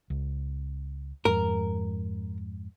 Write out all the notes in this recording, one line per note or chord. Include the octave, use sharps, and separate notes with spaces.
C#2
F2 G#2 A#4